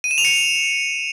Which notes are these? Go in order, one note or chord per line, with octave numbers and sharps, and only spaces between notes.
D#7
E7
F7
C#7